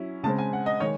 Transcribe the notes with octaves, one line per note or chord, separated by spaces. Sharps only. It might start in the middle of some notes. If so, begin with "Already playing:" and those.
Already playing: F#3 C#4 E4
C#3 G#3 C4 A5
G#5
F#5
D#5
D#3 G#3 C#5